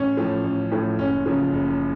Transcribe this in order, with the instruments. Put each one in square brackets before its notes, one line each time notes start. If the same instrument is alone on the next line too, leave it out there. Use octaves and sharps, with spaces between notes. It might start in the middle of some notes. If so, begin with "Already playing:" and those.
Already playing: [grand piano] A1 C#4
A2 F3
A1
A2 F3
F#1 C#4
F#2 C#3 F3
F#1